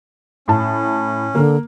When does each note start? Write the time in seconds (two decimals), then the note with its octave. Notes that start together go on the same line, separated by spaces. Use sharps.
0.48 A2 C#4 A5
1.35 D3 A#3